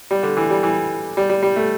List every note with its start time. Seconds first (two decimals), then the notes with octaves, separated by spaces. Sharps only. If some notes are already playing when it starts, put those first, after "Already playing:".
0.11 G3
0.23 D3
0.37 E3
0.50 G3
0.63 E3
1.17 G3
1.29 G3
1.42 G3
1.56 A3